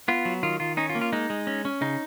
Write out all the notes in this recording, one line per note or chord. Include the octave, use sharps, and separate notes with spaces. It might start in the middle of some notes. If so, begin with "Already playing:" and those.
B3 F4
F#3
D#3 F4
D#3 F4
C#4 D#4
F4
A#3
F4
G#3 D#4
G#3
C#4
C#4
C#3 D#4